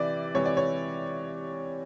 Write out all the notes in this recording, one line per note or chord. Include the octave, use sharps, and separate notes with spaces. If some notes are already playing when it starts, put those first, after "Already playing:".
Already playing: C3 E3 D5
C3 E3 C#5
D5
C#5